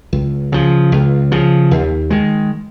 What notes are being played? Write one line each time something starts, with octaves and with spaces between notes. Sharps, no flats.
C#2
C#3 F3
C#2
C#3 F3
D#2
D#3 G#3